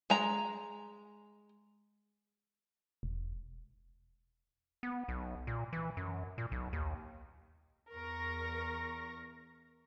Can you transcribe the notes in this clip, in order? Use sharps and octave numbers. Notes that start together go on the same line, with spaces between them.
G#3 A#5
E1
B3
B1
A#2
E3
F#2
A#2
B1
D#2
E2 A#4 C#6 A#6